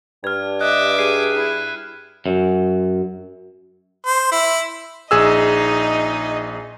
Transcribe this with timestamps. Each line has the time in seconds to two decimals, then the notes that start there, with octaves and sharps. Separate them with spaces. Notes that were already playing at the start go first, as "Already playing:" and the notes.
0.24 G2 F6 G#6
0.61 D#5 E5 D6 F#6
0.99 G#4 C7 D#7
1.34 E4
2.26 F#2
4.06 C5
4.32 E4
5.11 A#1 D#4 G#4 D#5 E6